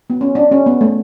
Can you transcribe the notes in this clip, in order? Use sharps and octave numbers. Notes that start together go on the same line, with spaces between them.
B3
C#4
D4
C#4
B3
A3